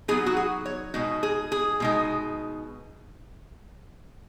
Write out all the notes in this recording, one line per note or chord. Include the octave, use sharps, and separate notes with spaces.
F#3 B3 D#4 G#4
F#4
G#4
C#5
B2 G#3 D#4 F#4
G#4
G#4
B2 G#3 D#4